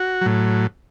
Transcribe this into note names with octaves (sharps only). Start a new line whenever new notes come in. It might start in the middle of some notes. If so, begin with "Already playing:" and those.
Already playing: F#4
A2 F#3